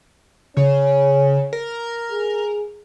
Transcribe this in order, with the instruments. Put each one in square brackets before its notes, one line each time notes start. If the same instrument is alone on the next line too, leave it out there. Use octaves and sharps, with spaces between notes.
[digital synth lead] C#3 [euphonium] C#4
[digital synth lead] A#4
[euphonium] G#4